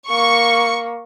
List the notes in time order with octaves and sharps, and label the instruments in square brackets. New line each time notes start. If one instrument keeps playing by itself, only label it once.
[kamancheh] A#3 [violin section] C#6